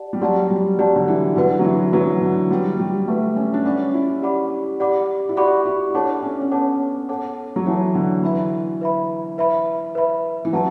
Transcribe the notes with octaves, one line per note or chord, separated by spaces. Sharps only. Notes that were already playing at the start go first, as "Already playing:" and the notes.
Already playing: G4 D5 F#5 A5
G3
F#3 G4 D5 F#5 A5
G3
F#3 G4 D5 F#5 A5
D3
E3
D3 F#4 B4 F#5
F#3
E3
F#3 F#4 B4 F#5
D3
G3 F#4 B4 F#5
G3
A3 F#4 B4 F#5
C#4
D4
C#4 G4 D5 F#5 B5 D6
E4
G4 D5 F#5 B5 D6
G4 D5 F#5 B5 D6
E4
F#4 G4 D5 F#5 B5 D6
E4
D4 A4 C#5 F#5 A5 D6
C#4
C#4
B3 A4 C#5 F#5 A5 D6
A4 C#5 F#5 A5 D6
F#3
E3 A4 C#5 F#5 A5 D6
D3
E3 B4 E5 B5
B4 E5 B5
B4 E5 B5
B4 E5 B5
E3
F#3 B4 F#5 A5